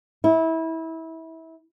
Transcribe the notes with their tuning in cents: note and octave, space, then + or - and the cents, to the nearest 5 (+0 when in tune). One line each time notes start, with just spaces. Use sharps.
E4 -25